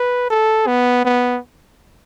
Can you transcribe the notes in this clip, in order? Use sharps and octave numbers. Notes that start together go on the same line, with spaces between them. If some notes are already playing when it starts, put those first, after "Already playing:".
Already playing: B4
A4
B3
B3